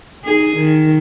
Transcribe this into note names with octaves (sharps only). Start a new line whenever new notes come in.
D#4 G#4
D#3